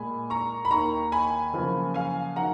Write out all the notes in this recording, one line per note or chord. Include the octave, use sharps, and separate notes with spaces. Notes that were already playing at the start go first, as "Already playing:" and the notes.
Already playing: A#2 G#3 G#5 B5
A#5 C#6
B5
D#2 D#3 A#3 A#5 C#6
G#5 B5
F#2 C#3 F3 A#3
F5 G#5
D#3 F#3 F#5 A#5